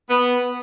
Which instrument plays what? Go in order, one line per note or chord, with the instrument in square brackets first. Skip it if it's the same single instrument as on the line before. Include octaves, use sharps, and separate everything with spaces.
[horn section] B3